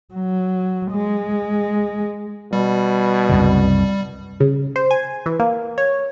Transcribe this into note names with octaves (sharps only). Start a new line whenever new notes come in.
F#3
G#3
B2 G3
C2 F#2 C#3
C#3
C5
G#5
E3
A#3
C#5